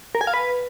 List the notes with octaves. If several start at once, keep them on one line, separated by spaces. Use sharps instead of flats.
A#4
G#5
F5
B4